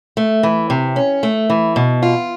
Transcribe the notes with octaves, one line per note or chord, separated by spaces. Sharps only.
A3
E3
C3
C#4
A3
E3
B2
F4